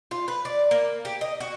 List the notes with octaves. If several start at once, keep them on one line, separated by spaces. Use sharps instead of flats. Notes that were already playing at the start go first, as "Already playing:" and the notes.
F4
B4
D5
A#3
G4
D#5
F#4